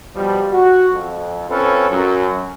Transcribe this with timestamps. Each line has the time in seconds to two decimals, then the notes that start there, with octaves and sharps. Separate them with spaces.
0.15 B2 F3 G3
0.52 F#4
0.92 F2
1.49 C4 C#4 F4 A4 B4
1.90 F#2